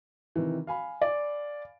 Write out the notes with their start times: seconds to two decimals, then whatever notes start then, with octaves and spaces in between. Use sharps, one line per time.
0.36 C3 D#3 E3
0.67 F5 G#5 B5
1.01 D5